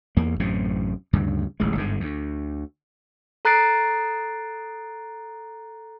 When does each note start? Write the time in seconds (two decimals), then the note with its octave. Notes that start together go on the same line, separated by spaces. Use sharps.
0.17 E2 A#3
0.40 A1 F#2 A2 C3
1.13 D2 G2 C#3
1.60 D1 A1 G#3
1.75 G1 G#2 D3
2.00 D2
3.45 A4 A#5 F#6 A6 C7 D7